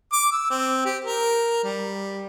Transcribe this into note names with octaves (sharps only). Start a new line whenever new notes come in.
D6
E6
C4
G4
A#4
G3